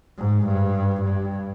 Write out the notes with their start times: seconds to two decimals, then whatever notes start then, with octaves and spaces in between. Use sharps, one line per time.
0.18 G#2
0.46 G2
1.03 G2